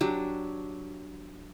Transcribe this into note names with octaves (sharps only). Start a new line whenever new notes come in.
F#3 D4 G4